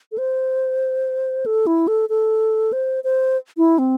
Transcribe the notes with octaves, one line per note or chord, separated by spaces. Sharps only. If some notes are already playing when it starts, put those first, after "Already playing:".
A4
C5
A4
E4
A4
A4
C5
C5
E4
C4